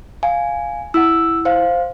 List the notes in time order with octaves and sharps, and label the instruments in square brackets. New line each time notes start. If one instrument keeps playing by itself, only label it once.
[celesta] F5 [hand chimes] G#5
[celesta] E4 F#5 [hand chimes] E6
[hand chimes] C5 F5